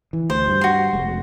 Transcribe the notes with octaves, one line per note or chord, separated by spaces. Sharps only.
E3
D2 C5
G2
F#4 C6
F1 G#3